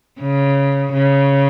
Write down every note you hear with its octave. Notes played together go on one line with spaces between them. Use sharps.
C#3
C#3